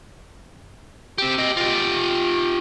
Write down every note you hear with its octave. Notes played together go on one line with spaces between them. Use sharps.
C4 G4
G4 D#5
F4 G4